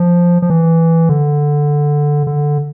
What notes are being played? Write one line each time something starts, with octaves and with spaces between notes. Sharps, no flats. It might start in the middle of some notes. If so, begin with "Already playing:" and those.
Already playing: F3
F3
E3
D3
D3